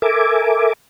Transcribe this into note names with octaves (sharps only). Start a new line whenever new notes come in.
A4 A#4 E5 G#5 D6